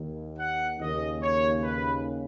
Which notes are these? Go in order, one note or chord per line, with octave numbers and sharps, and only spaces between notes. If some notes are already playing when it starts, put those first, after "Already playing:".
Already playing: D#2 D#3
F#5
D#2 C#3 D#5
C#5
B4